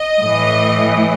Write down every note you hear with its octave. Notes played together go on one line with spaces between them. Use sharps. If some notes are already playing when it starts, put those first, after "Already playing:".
Already playing: D#5
A2 E3